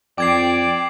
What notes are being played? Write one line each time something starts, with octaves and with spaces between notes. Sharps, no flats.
F2 D5 G5 D6 G#6 C7